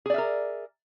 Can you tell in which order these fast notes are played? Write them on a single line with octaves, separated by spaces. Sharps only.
G#4 D5 E5 A#4